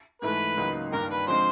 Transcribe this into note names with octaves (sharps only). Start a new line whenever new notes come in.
G#2 E3 A3 B4
C#2 C#3 F#3 A#3 D#4
G2 D#3 G3 A#3 D4 A#4
B4
D3 F3 G#3 C4 C5